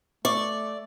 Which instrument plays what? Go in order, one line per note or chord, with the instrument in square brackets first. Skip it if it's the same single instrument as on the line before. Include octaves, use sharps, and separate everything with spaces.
[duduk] A3 [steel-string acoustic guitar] D5 [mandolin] C#6